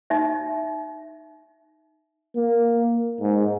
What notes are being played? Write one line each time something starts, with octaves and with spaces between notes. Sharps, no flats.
D#4 E5
A#3
G#2